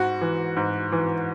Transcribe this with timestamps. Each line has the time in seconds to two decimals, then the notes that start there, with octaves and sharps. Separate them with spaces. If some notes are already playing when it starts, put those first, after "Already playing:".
Already playing: G#2 F#4
0.21 E3
0.57 G#2
0.92 E3